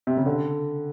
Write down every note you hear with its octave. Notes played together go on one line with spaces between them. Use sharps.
C3
C#3
D3